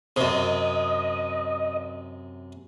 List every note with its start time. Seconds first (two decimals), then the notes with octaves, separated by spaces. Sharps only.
0.16 F#2 C3 D#5